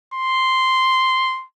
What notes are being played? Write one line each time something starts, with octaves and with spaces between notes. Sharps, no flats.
C6